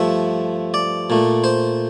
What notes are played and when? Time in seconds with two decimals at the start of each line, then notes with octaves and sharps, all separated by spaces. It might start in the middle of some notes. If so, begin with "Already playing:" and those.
Already playing: G2 F3 A3 E5
0.74 D5
1.10 A#2 A3
1.44 C5